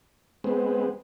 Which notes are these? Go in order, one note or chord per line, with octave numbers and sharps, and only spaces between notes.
G#3 B3 C4